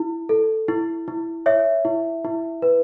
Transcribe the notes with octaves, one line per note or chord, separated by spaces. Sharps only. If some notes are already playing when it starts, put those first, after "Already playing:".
Already playing: E4
A4
E4
E4
C#5 E5
E4
E4
B4